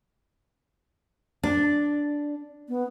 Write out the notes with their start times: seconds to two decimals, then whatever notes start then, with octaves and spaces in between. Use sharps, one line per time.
1.43 D4
2.69 B3